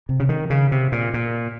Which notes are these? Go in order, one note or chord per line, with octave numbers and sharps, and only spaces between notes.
C3
C#3
D#3
C#3
C3
A#2
A#2